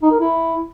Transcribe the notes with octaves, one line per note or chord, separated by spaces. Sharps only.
D#4
A#4
E4